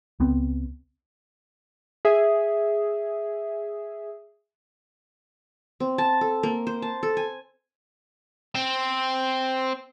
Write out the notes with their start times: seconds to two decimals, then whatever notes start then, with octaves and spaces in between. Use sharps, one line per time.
0.20 C#2 B3 C4
2.05 G#4 E5
5.80 C4
5.98 A5
6.21 A4
6.43 A#3
6.67 C5
6.82 A5
7.03 A4
7.17 G#5
8.55 C4